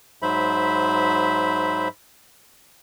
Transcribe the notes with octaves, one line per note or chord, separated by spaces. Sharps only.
G#2 F#3 C5 E5 B5